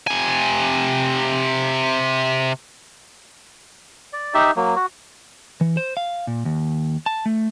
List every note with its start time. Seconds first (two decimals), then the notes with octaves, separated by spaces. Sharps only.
0.07 C3 G#5
4.13 D5
4.34 D#4 G4 E5
4.56 F#3 A#3
4.76 F#4
5.61 E3
5.77 C5
5.97 F5
6.27 A#2
6.45 D#2
7.06 A5
7.26 A3